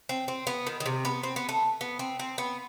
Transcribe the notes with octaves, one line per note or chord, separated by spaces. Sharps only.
C4
C4
B3
D#3
D#3
C3
B3
C4
B3
A3
B3
C4
C4
B3